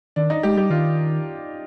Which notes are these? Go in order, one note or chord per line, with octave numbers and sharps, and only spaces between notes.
D#3 D4
D#4
G#3 G4
G3 G4
D#3 F4